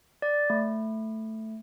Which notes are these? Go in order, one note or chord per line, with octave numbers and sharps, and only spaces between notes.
D5
A3